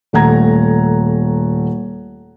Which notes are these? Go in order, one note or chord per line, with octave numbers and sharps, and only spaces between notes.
D#1 A3 F#5 A#5 G#6